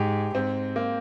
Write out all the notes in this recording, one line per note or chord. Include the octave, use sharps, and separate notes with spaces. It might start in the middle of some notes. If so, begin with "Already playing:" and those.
Already playing: G#2 G4 G#4
G#2 C4
A#3